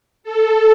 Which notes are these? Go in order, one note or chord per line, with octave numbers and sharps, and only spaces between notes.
A4